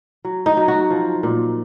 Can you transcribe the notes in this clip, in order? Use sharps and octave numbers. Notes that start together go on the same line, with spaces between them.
F#3
D#4
F#3
F#4
F3
A#2